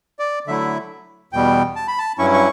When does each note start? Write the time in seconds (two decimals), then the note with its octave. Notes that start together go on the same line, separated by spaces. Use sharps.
0.19 D5
0.47 D3 F#3 A3 E4 E5
1.33 E2 B2 G3 B3 G5
1.76 A5
1.88 B5
1.98 A5
2.18 G2 F#3 C#4 E4 C#6
2.34 C#6